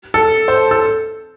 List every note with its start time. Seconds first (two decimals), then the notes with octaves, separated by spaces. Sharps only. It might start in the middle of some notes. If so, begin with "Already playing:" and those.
0.14 A4
0.48 C5
0.71 A4